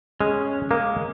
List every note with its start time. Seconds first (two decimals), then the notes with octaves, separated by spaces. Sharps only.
0.21 G#3 C#4
0.71 G#3 A#3